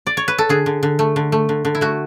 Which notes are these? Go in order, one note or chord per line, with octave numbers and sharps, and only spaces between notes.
D5
C#5
B4
A4
D3 G#4
D3
D3
A3
D3
A3
D3
D3
E4
A3 F#4